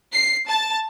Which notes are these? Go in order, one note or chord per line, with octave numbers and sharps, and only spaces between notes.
C7
A5